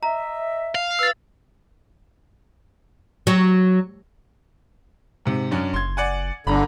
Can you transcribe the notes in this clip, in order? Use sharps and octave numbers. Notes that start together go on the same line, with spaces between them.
D#5 E5 A#5
F5
F4 B4 E6 A6
F#3
G#2 C3
F#2 C#4 D4
F#1 C6 G#6
D5 F#5 G#5
G1 D3 A#5 B5